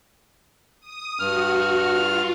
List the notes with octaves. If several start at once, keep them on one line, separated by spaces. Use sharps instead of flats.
D#6
G2 F#4 F6
F4